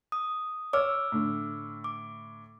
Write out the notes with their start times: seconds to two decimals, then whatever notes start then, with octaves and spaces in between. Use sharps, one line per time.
0.12 D#6
0.73 C#5 D6 E6 F6
1.12 A2 D3
1.84 D6